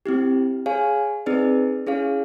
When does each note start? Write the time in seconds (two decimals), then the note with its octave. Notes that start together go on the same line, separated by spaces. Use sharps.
0.06 C4 E4 G4
0.66 G#4 C#5 F5 G#5
1.26 C4 D#4 G#4 B4 D5
1.87 C#4 E4 G#4 C#5 F5